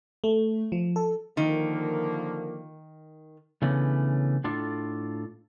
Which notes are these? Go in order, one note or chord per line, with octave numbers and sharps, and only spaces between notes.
A3
F3
A4
D3 D#3 F3 A#3
C#3 E3 A3 B3 C#4 D4
A2 D4 F4 A4